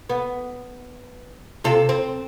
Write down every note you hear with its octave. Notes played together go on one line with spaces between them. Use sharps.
B3
C3 F4 A4
C4